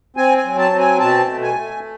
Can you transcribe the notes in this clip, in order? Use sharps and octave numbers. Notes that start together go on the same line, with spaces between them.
C4 G#5
G#5
F#3
A5
C4
G#5
B2 A5
A3
G#5
A3